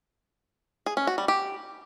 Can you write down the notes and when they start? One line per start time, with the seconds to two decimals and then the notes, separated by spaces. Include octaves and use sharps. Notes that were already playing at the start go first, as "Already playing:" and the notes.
0.86 G#4
0.97 C#4
1.07 F#4
1.18 G3
1.28 G4